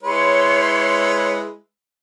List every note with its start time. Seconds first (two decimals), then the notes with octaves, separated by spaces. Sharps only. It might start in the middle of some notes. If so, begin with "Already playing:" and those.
0.03 G#3 E4 B4 C#5 C6